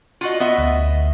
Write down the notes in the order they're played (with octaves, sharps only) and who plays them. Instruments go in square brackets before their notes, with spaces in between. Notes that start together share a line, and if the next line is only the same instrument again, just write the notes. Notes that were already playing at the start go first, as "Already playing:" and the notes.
[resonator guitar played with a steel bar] F4 F#4 D#5
B3 D#5 E5
[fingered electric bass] D2